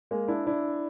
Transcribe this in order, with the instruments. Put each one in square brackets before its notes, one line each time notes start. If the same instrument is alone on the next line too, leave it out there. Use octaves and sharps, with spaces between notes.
[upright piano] G#3 A#3
D4 E4
D4 E4